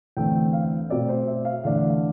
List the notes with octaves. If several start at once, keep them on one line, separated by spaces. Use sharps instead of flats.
E2 D3 A3 C4 G5
F5
B2 A3 C4 D5
C5
E5
F5
E2 D3 A3 D4 F5